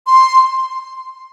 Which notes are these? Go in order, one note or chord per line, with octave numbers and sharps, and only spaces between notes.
C6